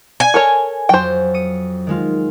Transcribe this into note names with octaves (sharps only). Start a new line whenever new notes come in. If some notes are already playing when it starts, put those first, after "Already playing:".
G#5
A4 A#4 C#5
F2 F#3 C5 G5
D#6 C#7 D#7
D#3 G#3 F4